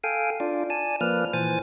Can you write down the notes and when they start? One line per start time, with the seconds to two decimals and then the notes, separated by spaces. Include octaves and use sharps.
0.04 A4 F5 G5 G#5
0.40 D4 F4 D5
0.70 D5 G#5 A5
1.01 F3 A#3 B4 D5 F6
1.33 A#2 E3 C5 G#5 A6